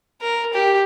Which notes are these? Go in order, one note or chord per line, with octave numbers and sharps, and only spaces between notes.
A#4
G4